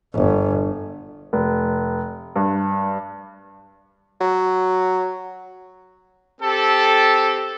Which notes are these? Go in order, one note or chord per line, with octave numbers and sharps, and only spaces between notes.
G1
F1
G2
F#3
C4 G4 A4